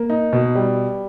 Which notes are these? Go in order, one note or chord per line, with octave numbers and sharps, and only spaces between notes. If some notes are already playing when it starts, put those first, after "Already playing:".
Already playing: A#3
D#4
B2
G3